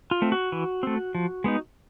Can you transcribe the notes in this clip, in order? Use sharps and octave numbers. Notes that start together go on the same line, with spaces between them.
F4
A3 C4
F#4
E3
A3 C4
F3
G#3 B3 D#4